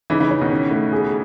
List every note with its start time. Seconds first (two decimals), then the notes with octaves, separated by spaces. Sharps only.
0.10 C#3 E3 D#4
0.20 C#3 E3
0.31 C#3 C#5
0.41 B2 D#3
0.52 C#4
0.71 A3
0.93 G#4